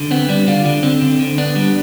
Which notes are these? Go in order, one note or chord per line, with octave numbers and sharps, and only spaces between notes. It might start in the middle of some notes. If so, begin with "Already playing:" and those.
Already playing: D3
B3 C4
G3 D4
D3 D4 F4
D3 D4
D3 C4
D3
D3
B3 D4
G3